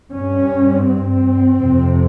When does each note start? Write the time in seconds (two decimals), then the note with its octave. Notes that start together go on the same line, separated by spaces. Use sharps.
0.11 G2 C#4
0.85 C4
1.57 F2 C3